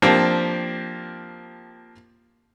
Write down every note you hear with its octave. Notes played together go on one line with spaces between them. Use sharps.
F3 A#3 C4 D4 G4